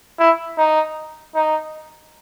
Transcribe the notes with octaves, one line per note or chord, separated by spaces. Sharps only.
E4
D#4
D#4